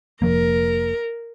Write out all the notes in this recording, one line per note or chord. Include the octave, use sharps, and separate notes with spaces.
F1 F3 A#3 A#4